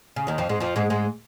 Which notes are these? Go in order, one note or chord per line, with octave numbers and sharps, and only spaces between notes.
C#3
D#2 D#3
F2 F3
G#2 G#3
F2 F3
G#2 G#3
G#2 G#3